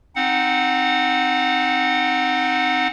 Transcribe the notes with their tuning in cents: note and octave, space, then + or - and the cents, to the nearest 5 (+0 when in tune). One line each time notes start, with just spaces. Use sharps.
C4 +0 D#4 -5 F#5 -15